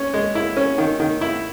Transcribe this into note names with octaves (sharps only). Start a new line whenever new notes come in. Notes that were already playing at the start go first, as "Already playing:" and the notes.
Already playing: C#4
G#3
E4
C#4
D#3
D#3
E4